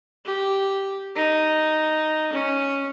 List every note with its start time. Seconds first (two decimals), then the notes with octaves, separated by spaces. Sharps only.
0.25 G4
1.16 D#4
2.32 C#4